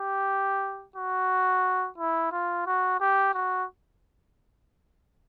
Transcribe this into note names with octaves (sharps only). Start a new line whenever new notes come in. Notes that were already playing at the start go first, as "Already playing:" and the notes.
Already playing: G4
F#4
E4
F4
F#4
G4
F#4